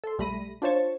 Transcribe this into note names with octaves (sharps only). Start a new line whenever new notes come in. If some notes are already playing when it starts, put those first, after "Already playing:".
A4 C6
B1 G3 A3 B5 A#6 D#7
D4 F4 C5 C#5 A5 C#6